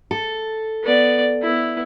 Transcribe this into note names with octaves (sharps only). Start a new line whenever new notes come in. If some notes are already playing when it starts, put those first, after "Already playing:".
A4
B3 D5
B3 E4